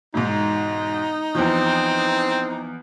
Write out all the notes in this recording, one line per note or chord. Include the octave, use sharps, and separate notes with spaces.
E1 G#2 D#4
E2 F3 C4